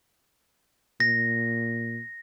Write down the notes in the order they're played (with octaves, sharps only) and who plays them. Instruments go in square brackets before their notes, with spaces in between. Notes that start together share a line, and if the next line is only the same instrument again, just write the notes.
[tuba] A#2 [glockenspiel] A#6